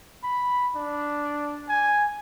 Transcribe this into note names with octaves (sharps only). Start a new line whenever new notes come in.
B5
D4
G#5